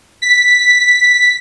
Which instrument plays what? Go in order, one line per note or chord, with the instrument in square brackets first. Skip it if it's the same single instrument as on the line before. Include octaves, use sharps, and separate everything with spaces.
[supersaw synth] B6